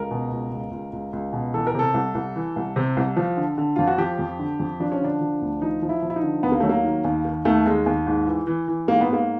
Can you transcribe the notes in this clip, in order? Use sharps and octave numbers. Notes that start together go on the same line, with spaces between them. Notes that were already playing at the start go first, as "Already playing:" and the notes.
Already playing: C#2 A#4
B2
C#2
C#2
C#2
C#2
C#2
B2
E3 A4
A#4
C3 A4
C2
C2
E3
C2
C3
C2
F3
D3
D3
F2 F4
F#4
F3 G4
F2
D3
F2
F3 D4
C#4
D3 D4
F3
D2
F3 D#4
F3
E4
F3
E4
D#4
D3
D#2 B3
A#3
F#3 A3
A#3
D#3
D#2
D#3
D#2 A3
D#2 G#3
D#2
G#2
E3
E3
E3
G#2 A#3
B3
G#2 A#3